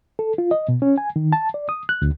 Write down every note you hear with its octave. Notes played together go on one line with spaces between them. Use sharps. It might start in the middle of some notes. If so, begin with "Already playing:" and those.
A4
F4
D#5
B2
C#4
G#5
D#3
A5
D5
D#6
F#6
D2